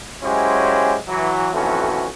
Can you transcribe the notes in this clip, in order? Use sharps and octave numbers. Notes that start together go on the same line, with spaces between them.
F#3 G#3 C#4 E4 G4 C5
E3 F#3
B1 F2 E3 A3 C#4 F#4